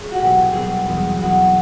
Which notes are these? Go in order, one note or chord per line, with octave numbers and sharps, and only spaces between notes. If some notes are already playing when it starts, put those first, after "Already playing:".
Already playing: C#2 C#3 G#4
F#4
C2 B2 F#3 G4
C2 B2 F#3 G#4
E2 B2 F#3
E2 B2 F#3 F#4